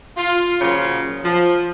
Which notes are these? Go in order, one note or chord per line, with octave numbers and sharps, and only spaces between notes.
F4
A#2 C#3 F3 F#3 F4 C#5
F3